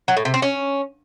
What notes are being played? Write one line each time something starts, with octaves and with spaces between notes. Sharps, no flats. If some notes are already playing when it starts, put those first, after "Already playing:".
F#3
A2
C3
C4
C#4